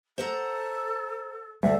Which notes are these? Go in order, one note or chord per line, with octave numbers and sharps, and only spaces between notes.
A4 C5 F#5 A#5
D2 G3 A3 A4